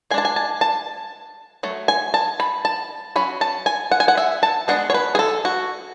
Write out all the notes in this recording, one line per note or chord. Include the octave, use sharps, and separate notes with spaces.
G#3 D4 G#5 A5
G#5
A5
A5
F#3 A3
G#5
A5
B5
A5
F#3 C#4 B5
A5
G#5
F#5
G#5
F#5
E5
A5
G#3 B3 D4 F#5
C#5
B4
G#4
A4
F#4